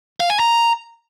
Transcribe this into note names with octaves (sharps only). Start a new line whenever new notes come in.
F5
G#5
A#5